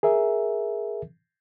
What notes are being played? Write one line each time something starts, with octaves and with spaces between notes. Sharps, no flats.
G#4 A#4 E5